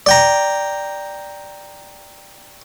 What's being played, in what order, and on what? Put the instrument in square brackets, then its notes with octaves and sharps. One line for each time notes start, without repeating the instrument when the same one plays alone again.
[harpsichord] D5 G5 A#5